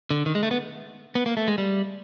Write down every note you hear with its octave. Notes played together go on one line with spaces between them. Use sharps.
D3
D#3
G#3
A3
B3
B3
A#3
A3
G#3
G3